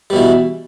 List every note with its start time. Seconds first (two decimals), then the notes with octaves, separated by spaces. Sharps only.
0.10 G3
0.13 B2
0.16 E3